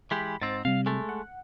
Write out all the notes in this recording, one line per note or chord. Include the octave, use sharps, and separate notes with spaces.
E3 G#3 G4 B5
G#2 C4 A6
C3 G3 F5
G#3 A3
F#5